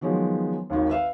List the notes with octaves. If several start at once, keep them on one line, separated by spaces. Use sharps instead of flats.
D#3 F3 F#3 G#3 B3
G#1 D#2 D#3
B4 E5 F5